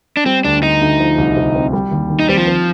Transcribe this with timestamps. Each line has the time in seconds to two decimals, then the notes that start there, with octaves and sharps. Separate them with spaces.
0.17 D4
0.26 G3 C4
0.44 D2 D4
0.63 D3 D#4
0.81 D2
1.00 F3
1.18 C2
1.36 C3
1.55 C4
1.73 G3
1.91 D#2
2.10 D#3
2.19 D#4
2.29 G3 C4
2.37 F3
2.47 C4